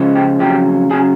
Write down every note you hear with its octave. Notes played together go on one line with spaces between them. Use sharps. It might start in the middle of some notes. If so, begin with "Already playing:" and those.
Already playing: C#2 C#3 F3 G#3
G4
F2 C#3 F#3 G4
C#3 F#3 G#4